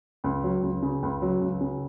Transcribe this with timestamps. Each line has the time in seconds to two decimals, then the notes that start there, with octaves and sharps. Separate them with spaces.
0.24 C#2
0.43 F#3
0.63 C#2
0.82 C#3
1.03 C#2
1.22 F#3
1.41 C#2
1.61 C#3